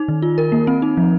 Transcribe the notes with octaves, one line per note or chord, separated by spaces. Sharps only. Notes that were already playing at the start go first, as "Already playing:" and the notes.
Already playing: D#4
D#3
F4
A#4
A#3
C4
D#4
F3